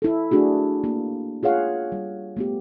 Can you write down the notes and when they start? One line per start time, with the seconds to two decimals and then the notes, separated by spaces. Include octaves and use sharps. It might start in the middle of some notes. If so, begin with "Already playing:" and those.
0.02 E4 A4
0.31 A3 D4 F#4 G#4
0.84 A#3
1.43 F4 G#4 C#5 F5 F#5
1.92 G3
2.37 A3 B3 G4